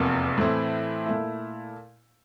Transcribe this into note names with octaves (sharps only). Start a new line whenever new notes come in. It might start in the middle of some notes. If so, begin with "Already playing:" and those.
Already playing: F1 E2 C3 F3 A#3
A2 E3 A3 C4 E4
A#2 A3 E4